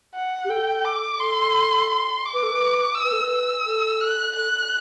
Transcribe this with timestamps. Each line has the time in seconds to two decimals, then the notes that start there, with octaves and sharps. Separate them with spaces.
0.15 F#5
0.45 G4
0.49 A4 G5
0.85 D6
1.20 A4 C6
1.90 C6
2.25 D6
2.34 B4
2.43 A4
2.52 B4
2.95 E6
3.04 B4
3.12 A4
3.21 B4
3.31 E6
3.66 A4
4.01 F#6
4.36 A4 F#6